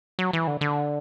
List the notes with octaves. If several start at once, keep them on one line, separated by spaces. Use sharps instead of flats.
F#3
E3
D3
D3